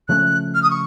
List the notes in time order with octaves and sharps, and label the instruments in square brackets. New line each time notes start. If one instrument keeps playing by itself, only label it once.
[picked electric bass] C#3 F3 A3 C#4 [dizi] F#6
[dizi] F6
D#6
C#6